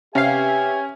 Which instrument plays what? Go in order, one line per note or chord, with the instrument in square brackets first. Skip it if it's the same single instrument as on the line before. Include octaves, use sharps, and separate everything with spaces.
[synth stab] C3 F5 [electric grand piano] C#4 [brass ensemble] G4 B4 E5 [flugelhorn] G#5